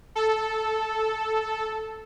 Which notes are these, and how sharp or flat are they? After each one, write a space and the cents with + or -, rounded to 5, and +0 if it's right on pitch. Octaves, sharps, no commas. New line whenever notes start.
A4 -5